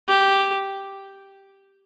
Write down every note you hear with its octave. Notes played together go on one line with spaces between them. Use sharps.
G4